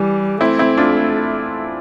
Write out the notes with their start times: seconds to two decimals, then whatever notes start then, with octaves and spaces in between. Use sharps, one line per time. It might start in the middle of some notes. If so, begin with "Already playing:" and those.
Already playing: E3 G3
0.41 A3 C4 E4
0.59 C4 E4
0.77 D4 F4